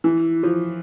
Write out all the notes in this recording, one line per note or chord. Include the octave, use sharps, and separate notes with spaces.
E3
F3